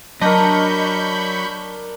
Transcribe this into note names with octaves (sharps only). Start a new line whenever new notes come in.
F#3 D4 A#4 D#5 B5 C#6 G6